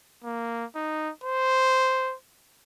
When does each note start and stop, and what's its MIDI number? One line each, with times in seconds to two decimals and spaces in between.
0.24 0.65 58
0.75 1.11 63
1.24 2.15 72